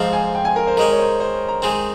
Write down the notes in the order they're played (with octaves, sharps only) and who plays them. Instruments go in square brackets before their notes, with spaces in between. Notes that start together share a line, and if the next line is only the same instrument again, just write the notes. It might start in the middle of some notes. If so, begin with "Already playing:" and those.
Already playing: [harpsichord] G#2 F3 C4 [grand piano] F5
[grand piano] G#5
G5
G#5
A#4
C5
[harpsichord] D#3 G#3 C#4 [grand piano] A#4
[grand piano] C#5
C5
C5
A#5
[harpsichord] D#3 G#3 C4 [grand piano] G#5